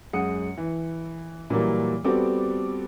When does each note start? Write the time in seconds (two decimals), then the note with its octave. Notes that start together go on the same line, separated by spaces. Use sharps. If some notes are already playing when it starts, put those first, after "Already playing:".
0.13 F#2 G#3 F#5 D#6 C#7
0.58 E3
1.50 A#2 E3 F#3 G3 A#3
2.05 G3 B3 C4 F#4 A4 D6